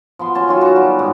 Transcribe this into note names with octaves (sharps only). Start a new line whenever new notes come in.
F3 B3 C6
C#4 A5 C6
D#3 F#3 F4
B3 F#4 A4
G3
G#2